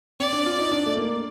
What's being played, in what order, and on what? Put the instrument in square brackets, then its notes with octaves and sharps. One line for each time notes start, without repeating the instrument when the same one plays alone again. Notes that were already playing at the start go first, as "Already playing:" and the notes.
[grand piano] C4 [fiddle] D5
[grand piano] D4
F4
D#4
D4
A3
A#3